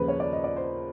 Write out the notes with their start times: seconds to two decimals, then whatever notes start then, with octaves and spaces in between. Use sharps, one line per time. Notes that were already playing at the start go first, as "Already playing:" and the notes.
Already playing: D#2 C#3 F3 G#3 A#4 B4
0.08 C#5
0.20 D5
0.32 D#5
0.44 D5
0.56 C5